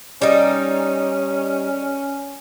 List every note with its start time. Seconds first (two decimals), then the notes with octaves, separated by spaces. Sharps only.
0.22 G3 C#4 D#4